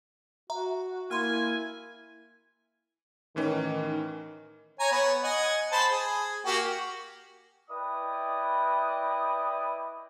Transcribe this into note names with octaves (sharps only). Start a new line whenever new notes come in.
F#4 E5 A#5
A#3 E4 G#5 C6 F6
A2 D#3 E3 C#4
C#5 G#5 A#5
B3 C#5
D#5 F#5 G#5
C5 A5 B5
G#4
A#3 F#4 G4
E4 B4 D5 D#5 G5 D#6